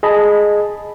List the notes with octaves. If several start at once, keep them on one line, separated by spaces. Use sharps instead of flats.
G#4 D#5 A5 B5